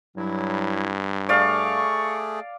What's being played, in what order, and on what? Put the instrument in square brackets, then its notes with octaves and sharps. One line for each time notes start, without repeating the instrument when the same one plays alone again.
[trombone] G2 [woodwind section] F#3 E4
[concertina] A3 G#4 [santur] D5 F5 [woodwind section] C#6